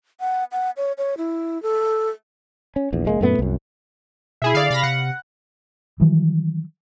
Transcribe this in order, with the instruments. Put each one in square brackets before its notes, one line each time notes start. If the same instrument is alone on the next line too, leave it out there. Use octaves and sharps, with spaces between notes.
[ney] F#5
F#5
C#5
C#5
E4
A4
[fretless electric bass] C#4
A#1 E2
F1 G#3 A#3
F#2 A#2 A3 B3
C2 F#2
[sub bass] B2 [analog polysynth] E4 G#4 E5
[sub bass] D3 [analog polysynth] D5 F5
[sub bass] C3 [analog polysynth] F5 B5 A#6
[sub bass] C3 [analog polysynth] F#5
[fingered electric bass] D#3 E3 F#3 G3